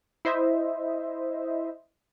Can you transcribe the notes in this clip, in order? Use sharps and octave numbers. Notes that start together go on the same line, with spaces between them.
E4 C5 D#5 E5